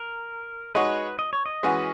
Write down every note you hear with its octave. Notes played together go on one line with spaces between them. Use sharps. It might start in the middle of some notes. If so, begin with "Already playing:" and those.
Already playing: A#4
G#3 D#4 F#4 B4 C#5
D#5
C#5
D#5
E3 G#3 C#4 F#4 B4